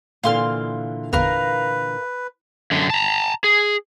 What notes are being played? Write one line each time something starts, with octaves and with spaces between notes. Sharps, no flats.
A#2 D3 E3 F5 C6 F6
G1 E2 A#4 B4 F5
F#2 D3
A5 A#5
G#4